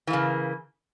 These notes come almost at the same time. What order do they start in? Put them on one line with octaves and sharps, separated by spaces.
E3 A#3 C#3